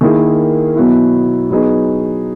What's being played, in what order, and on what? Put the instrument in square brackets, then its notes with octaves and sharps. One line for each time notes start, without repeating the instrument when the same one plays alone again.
[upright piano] D#3 A#3 E4 G#4
B2 F#3 B3 E4
F#3 B3 D#4 G#4 B4